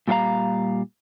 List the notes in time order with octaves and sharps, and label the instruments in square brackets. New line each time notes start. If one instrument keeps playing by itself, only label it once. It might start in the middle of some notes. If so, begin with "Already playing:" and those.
[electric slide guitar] A#2 G3 F#4 A#4 F5 A#5